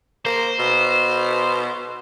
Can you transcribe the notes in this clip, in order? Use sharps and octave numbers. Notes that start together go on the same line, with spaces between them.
A#3 C5
B2